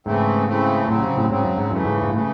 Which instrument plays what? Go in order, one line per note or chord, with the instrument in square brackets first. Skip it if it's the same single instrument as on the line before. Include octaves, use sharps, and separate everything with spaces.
[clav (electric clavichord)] G#2 [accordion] C#3 E3 A3 C4
[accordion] C#3 E3 A3 C4
[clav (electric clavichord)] A2 [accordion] C#3 F#3 C4
[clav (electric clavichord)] C3
A2
[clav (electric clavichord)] G#2 [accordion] C#3 F#3 C4
[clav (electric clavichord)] F#2
G#2
[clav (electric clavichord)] F#2 [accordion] C#3 E3 A3
[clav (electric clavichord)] G#2
G#2
A2
[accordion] C#3 E3 A3